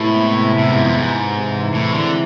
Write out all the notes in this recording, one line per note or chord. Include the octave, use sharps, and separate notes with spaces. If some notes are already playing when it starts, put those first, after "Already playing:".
Already playing: A2 C3 G#3 B3 E4
A2
G#2
F2
G#2
C3 E3 G#3
A2
D3